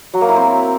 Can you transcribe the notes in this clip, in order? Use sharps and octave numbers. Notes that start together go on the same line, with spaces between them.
F#3
A#3
E4
C4